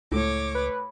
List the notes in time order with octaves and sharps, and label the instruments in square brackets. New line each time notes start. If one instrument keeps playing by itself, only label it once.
[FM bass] C#2 [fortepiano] A2 [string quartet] C#5 D6
[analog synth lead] B4